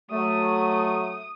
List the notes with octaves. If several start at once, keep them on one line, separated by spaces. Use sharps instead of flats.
F#3 A3 D#6